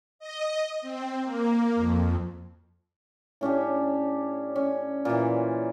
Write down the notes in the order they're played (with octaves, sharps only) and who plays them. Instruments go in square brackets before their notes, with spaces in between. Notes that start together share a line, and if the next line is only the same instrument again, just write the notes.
[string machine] D#5
C4
A#3
F2
[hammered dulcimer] A2 C#4 D4 G4
C#4
A#2 E3